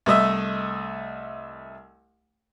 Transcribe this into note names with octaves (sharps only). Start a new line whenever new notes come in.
C2 A3 D#5 E5